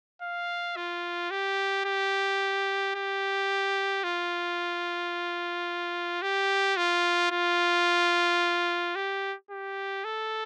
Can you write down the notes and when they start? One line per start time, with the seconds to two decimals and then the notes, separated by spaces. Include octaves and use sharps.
0.22 F5
0.76 F4
1.31 G4
1.85 G4
2.95 G4
4.04 F4
6.22 G4
6.77 F4
7.32 F4
8.95 G4
9.51 G4
10.04 A4